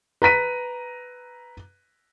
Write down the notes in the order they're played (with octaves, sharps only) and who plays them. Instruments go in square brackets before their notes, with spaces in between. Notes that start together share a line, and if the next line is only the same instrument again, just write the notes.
[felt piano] B4 A#5 B6 D#7